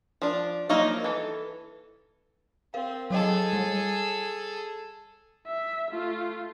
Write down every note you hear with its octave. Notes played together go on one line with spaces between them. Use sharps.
F3 D4
F3 F#3 A#3 D#4
E3 A4
C4 A#4 F5
F#3 G#4 A4 C#5 D#5
G3
E5
A3 F4